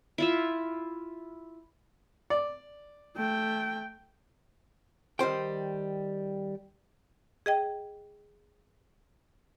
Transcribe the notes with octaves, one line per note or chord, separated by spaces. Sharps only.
E4 F4 E5
D5
A3 G5
D#3 G3 C5 G5
G#4 D#5 G5